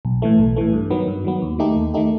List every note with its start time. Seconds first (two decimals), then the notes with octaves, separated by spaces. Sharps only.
0.05 B1
0.22 A2 E3 A3
0.39 B1
0.56 A2 E3 A3
0.73 G2
0.90 D#3 F#3 B3
1.08 G2
1.24 D#3 F#3 B3
1.42 D#2
1.59 D#3 A3 D#4 G4
1.76 D#2
1.94 D#3 A3 D#4 G4